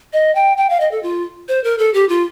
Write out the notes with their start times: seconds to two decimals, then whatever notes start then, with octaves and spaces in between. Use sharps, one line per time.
0.13 D#5
0.35 G5
0.57 G5
0.70 F5
0.80 D#5
0.91 A4
1.03 F4
1.48 C5
1.64 A#4
1.78 A4
1.94 G4
2.09 F4